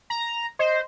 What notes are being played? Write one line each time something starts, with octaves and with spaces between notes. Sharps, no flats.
A#5
C5 D#5